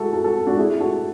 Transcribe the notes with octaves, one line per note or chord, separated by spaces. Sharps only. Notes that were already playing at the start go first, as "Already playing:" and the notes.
Already playing: E4 F#4 G#4 A4
F#4 A4
F#4 A4
D4 F#4
E4 G#4
F#4 A4